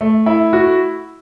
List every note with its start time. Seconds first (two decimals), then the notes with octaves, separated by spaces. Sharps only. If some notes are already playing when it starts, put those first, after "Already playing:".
0.01 A3
0.26 E4
0.53 F#4